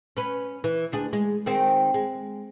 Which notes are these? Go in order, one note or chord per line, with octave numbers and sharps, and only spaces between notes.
C#4 B4
E3
D2 D4 G#4
G#3
D#3 G#3 C4
G#3